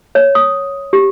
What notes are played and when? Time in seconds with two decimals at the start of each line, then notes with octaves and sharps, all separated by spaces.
0.15 C#5
0.35 D#6
0.93 G4